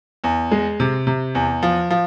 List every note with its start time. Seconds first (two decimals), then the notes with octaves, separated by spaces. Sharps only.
0.24 E2
0.51 G#3
0.80 C3
1.07 C3
1.35 E2
1.63 F3
1.90 F3